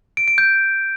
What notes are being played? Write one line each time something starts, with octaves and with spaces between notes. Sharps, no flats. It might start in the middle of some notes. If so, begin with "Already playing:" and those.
D7
D7
G6